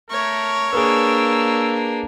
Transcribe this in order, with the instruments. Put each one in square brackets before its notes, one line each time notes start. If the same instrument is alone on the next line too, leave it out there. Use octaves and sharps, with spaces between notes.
[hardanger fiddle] A3 [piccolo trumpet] A#4 [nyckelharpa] C#5
[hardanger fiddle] A#3 D4 [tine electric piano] G#4 A#4 B4 [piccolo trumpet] E6